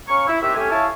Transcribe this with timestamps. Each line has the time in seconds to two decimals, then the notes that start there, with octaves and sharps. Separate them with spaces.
0.08 C#4 F5 A#5 C#6
0.28 E4
0.41 D#2 C3 G4 E5
0.55 A3 C#4 G4 E5 G#5
0.71 E4 C#5 E5 F5 G#5 A5